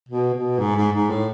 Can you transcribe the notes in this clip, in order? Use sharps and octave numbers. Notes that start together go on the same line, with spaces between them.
B2
B2
G#2
G#2
G#2
A2